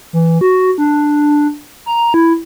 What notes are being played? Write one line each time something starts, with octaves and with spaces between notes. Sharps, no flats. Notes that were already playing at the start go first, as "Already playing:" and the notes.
E3
F#4
D4
A#5
E4